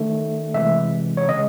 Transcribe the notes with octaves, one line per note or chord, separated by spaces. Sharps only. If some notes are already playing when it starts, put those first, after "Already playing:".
Already playing: D#3 A3
C3 E3 G#3 E5
C#5
C#3 G#3 D#5